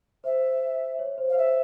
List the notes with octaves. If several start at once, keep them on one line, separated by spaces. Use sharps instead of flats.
C5 E5
C#5
C5
F5
C5 E5